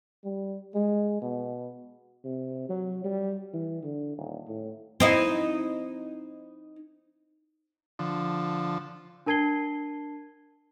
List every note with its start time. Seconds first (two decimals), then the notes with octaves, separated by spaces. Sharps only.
0.24 G3
0.75 G#3
1.22 B2
2.25 C3
2.69 F#3
3.04 G3
3.53 E3
3.83 D3
4.17 D#1
4.48 A2
5.00 C4 D#4 E4
7.99 D3 F3
9.26 D4 A#4 A5 G#6 C7 G7